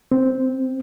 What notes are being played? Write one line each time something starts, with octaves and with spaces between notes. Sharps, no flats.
C4